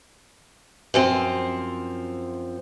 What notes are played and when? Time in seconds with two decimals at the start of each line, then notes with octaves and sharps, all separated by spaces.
0.94 F#2 F3 C4